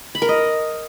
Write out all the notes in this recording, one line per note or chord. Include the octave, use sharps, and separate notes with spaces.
B5
A#4
D#5